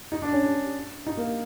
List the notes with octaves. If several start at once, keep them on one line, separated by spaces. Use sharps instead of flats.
D#4
D4
C#4
D4
D#4
A#3